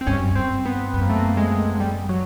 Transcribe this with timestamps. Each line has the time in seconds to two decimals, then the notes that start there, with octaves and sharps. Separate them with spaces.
0.01 C4
0.07 G2 C#4
0.19 F#2
0.31 G2 C4
0.66 B3
0.93 F#2 B3
1.01 A#3
1.10 A3
1.17 A#3
1.37 G#3
1.80 G3
2.09 F#3